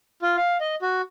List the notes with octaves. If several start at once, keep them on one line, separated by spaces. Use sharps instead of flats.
F4
F5
D#5
F#4